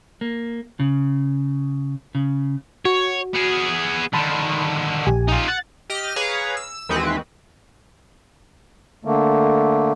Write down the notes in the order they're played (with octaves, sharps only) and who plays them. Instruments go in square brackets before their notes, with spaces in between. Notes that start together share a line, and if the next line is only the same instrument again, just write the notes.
[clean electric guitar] A#3
C#3
C#3
[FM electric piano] F#4 [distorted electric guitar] C#5
[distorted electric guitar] B3 G#4
[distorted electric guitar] D3 D#3 [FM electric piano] A5 B5 C6
[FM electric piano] A#1 G4 G#5
[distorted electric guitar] D#4 F4
[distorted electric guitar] F#5 [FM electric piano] A6
[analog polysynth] G4 D#5 F6
G#4 B4 C#5 F5 A#5
E6
D#2 E3 G#3 C4 F#4 B4
[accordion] D3 A3 A#3